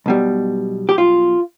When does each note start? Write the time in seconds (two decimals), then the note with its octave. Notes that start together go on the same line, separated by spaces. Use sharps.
0.06 B1 B2 G3
0.89 G4
0.98 F4